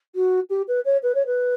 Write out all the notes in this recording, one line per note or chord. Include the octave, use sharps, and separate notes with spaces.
F#4
G4
B4
C#5
B4
C#5
B4